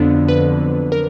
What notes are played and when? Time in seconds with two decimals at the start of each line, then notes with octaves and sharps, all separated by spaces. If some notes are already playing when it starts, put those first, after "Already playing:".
Already playing: F2 D3 F#3 B3 D4
0.28 B4
0.92 A#4